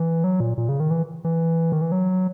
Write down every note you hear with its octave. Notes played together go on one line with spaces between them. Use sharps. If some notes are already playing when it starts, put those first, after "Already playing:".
Already playing: E3
F#3
A#2
A#2
C#3
D#3
E3
E3
D#3
E3
F#3